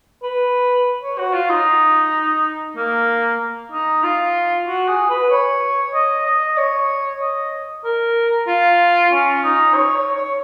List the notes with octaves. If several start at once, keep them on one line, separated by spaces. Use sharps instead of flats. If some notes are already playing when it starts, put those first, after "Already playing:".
B4
C#5
F#4
F4
D#4
A#3
D#4
F4
F#4
G#4
B4
C#5
D#5
D#5
C#5
D#5
A#4
F4
C#4
D#4
C#5
C#5
C#5